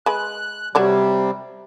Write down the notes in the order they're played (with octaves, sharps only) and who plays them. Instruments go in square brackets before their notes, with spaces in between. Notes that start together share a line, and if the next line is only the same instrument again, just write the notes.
[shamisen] G#3 B4 [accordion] F#6
[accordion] C3 G3 [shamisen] F#3 C#5 D5